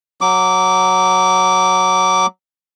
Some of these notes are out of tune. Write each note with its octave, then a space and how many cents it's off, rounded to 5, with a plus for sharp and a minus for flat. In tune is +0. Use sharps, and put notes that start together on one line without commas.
F#3 +0 D6 -15